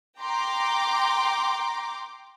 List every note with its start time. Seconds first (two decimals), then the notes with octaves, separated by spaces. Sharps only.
0.20 G5 A#5 C6 D6